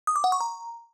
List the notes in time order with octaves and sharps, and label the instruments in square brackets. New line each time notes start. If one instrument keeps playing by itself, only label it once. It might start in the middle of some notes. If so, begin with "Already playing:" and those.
[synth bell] D#6
D6
F#5
C#6
A#5